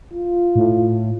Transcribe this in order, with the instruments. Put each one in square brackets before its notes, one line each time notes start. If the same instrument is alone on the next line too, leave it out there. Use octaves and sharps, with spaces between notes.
[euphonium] F4
[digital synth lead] A2